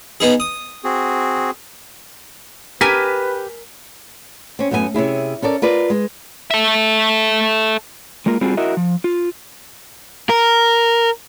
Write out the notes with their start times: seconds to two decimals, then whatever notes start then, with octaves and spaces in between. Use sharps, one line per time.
0.20 B3 D#4 G#4
0.40 D#6
0.84 C4 F#4 G#4
2.81 G4 A#4 B4 G#5 B6 D#7
4.59 C4 C#4
4.71 F#2 A3 B3 G#4 G#5
4.94 C3 C#4 E4 G#4
5.42 C#4 A4 A#4 D5
5.62 F4 A#4 B4 D5
5.90 G#3
6.51 A4 E5
8.26 G#3 A#3 F4 A#4
8.41 G3 C4 D4 F4 F#4 G#4
8.57 E4 F#4 A#4 D#5 E5
8.77 F3
9.04 F4
10.29 A#4